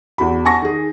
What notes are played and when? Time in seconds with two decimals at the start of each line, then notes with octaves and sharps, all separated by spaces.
0.18 E2 F#4 B5
0.45 F#5 G#5 A5 C#6 A#6
0.62 D#3 G#4